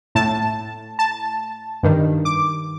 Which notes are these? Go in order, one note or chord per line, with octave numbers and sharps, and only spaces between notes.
A2 A5
A5
G2 D#3
D6